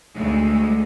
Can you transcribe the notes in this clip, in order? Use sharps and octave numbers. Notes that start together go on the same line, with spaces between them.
D2 G#3 A3